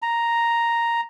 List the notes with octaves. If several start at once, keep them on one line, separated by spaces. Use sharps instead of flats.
A#5